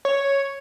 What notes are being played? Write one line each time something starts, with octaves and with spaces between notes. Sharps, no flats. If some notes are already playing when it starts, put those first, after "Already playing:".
C#5